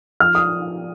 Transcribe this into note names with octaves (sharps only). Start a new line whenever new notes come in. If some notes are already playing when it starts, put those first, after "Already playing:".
F3 F6
D#6